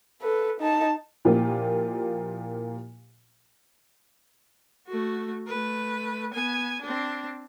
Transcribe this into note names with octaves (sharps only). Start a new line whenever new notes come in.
A4 B4
D#4 A5
A#2 F3 A#3 E4 F4 G4
A3 F#4
A3 B4
B3 G#5
C4 D4